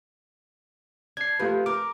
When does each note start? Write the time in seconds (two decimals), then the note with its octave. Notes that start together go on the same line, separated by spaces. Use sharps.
1.17 D4 G#6 C7
1.40 C3 F3 A3 F4 B4
1.66 A#4 D6